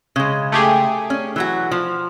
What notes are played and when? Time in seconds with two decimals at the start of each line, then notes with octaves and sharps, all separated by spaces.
0.16 C#3 G#3
0.52 A3 G4 G#4
1.10 C#4
1.36 E3 F#3 F#4
1.71 F3